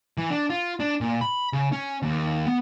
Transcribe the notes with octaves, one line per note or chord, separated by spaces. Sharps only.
E3
D4
F4
D4
A#2
B5
C#3
C#4
D#2
B3